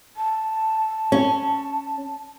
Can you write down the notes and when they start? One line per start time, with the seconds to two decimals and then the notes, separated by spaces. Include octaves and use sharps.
0.17 A5
1.12 C#4